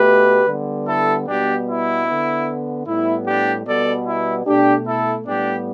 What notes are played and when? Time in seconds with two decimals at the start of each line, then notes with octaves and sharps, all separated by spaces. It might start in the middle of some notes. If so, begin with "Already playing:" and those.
Already playing: B2 A3 G4 B4
0.46 D3 G3 B3
0.87 E4 A4
1.27 B2 G3 B3 D4 G4
1.67 E4
2.07 D3 B3
2.87 A2 G3 B3 E4
3.26 D4 G4
3.66 B2 G3 B3 A4 D5
4.06 E4
4.46 B2 A3 D4 G4
4.86 E4 A4
5.26 A2 G3 B3 D4 G4